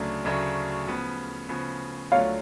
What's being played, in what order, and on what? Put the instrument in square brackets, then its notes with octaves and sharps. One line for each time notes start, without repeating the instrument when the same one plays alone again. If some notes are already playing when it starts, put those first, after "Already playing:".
Already playing: [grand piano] D2 C#3 F#3 A3 D4
D2 C#3 F#3 A3 D4
C#3 F3 B3
C#3 F3 B3
[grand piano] D2 D3 F#3 A3 F4 [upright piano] C#5 F5